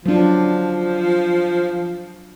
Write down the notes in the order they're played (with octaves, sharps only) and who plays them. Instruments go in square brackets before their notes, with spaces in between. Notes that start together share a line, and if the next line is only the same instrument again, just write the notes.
[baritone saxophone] F3 [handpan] F#3 D4